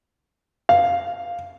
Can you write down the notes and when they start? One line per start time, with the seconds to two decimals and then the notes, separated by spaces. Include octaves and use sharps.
0.69 F5